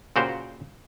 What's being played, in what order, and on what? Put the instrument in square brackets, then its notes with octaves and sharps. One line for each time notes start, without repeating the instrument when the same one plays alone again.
[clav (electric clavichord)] A#2 C#3 F#4 G4 C5